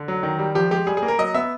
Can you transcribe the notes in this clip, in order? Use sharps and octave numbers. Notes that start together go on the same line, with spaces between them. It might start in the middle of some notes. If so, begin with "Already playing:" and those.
Already playing: D3
F#3
D#3
G3
F3 G4
G#3 G4
G3 G#4
G#4
A#3
A#4
F#3 D#5
B3 E5